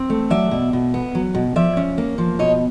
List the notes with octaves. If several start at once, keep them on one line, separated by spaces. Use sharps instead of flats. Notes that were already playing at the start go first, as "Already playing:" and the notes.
Already playing: C4
A3
F#3 D5 E5
B2
B2
B3
F#3
B2
F3 D5 E5
C#4
A#3
F3
B2 C#5 D#5